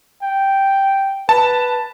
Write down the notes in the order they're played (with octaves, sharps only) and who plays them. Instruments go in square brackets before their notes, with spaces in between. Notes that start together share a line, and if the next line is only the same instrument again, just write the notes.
[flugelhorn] G5
[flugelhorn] B4 [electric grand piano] A5